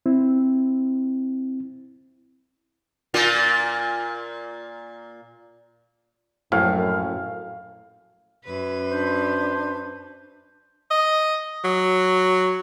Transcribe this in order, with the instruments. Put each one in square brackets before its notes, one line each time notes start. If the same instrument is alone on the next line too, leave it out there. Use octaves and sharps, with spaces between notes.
[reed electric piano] C4 E4
[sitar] A#2 A#3 F4
[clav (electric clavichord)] A#1 A2 [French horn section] F#2 [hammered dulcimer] F5
[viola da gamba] F#2 B4
[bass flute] D4 [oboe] C5
[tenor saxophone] D#5
F#3